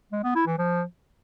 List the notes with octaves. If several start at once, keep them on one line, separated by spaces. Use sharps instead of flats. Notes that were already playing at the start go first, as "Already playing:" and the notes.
G#3
B3
E4
E3
F3